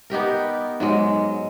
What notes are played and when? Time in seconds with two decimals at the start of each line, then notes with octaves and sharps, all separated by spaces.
0.10 B3 D#4 G4 A#4
0.80 G#2 F#3 G#3